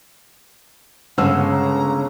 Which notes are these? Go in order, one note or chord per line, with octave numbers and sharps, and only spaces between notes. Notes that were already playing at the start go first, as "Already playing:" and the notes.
G1 C#3 G#3 F#5 E6
A#5